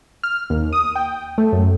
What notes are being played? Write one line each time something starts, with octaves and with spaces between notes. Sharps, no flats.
F6
D#2
D#6
G5
A3
F#2